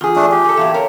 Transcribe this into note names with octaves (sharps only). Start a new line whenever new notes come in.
E2 F4 G#4
A3 D4
G4
G#4 A4
E2 A#2 F#3 E5 F5
A#4 C#5